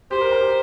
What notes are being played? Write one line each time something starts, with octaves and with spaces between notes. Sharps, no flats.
G4 C5
A#4
A#4
G4